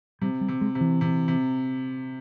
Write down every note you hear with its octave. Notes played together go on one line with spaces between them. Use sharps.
C3 G3
G3
C3
G#3
C3
E3
C3
C3